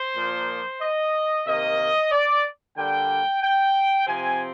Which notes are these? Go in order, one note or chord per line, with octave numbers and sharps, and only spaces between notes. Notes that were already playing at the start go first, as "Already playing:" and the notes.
Already playing: C5
A#2 F3 A#3
D#5
C3 D#3 A#3 D#5
D5
D3 G3 A#3 G5
G5
C3 F3 C4 G#5